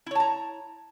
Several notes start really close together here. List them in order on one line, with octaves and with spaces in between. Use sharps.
E4 C#5 A5 A#5